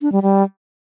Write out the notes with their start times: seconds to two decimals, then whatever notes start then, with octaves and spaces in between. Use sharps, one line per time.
0.02 D4
0.12 G3
0.22 G3